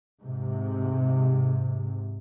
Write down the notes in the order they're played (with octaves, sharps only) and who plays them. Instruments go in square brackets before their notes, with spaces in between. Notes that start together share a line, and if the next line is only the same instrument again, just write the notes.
[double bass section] G#2 C3